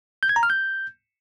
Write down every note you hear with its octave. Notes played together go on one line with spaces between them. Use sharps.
G6
G#6
A#5
F6
G6